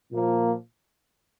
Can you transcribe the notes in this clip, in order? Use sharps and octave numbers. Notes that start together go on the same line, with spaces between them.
A#2 F3 A#3